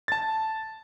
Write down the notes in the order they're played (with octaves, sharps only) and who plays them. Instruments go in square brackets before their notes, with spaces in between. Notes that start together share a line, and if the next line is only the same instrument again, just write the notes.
[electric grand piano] A5 A6